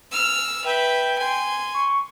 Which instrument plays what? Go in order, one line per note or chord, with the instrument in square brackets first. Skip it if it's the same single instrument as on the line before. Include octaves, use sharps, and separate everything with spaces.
[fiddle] E6 F6
[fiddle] B4 E5 [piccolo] G5
[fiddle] G#5 C6
[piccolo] C#6